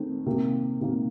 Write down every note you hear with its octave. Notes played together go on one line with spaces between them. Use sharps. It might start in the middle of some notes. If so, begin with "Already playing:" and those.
Already playing: D#3 A3 C4
C3 D#3 A#3
C3 D#3 A#3